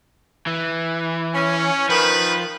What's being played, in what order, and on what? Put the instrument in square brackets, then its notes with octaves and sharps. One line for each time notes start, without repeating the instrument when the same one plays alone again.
[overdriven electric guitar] E3
[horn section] C#4
[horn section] D#3 B4 [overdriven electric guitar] F3